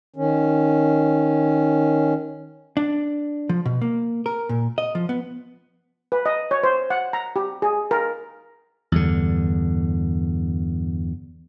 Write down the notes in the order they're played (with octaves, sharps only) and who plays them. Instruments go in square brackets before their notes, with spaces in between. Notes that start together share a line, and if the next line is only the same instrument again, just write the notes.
[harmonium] D#3 C#4
[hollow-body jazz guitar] D4
F3
B2
A#3
A#4
A#2
D#5
F3
B3
[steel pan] B4
D#5
C#5
C5
F#5
A#5
G4
G#4
A#4
[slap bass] E2 G2 D3